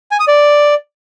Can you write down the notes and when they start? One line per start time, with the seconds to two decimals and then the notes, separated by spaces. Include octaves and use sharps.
0.11 G#5
0.20 D#6
0.28 D5